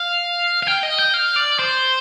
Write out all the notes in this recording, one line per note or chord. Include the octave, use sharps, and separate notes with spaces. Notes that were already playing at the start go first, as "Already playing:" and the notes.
Already playing: F5
F5
G5
D#5
G5
F5
D5
C5